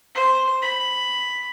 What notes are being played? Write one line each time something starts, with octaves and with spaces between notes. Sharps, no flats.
C5
B5